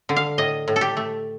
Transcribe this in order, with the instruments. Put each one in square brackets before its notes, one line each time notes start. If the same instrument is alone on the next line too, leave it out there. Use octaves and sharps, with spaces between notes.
[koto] D3
F5
A2 D#5
A2
A4
G4
A3